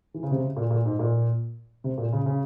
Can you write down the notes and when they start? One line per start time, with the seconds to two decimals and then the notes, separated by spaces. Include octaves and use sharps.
0.14 E3
0.23 C#3
0.31 C3
0.39 C#3
0.57 A#2
0.71 A#2
0.85 G#2
0.99 A#2
1.84 C3
1.98 A#2
2.13 C#3
2.26 C#3